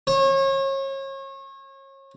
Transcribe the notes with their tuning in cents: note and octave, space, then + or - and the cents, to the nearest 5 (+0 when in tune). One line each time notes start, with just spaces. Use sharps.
C#5 -35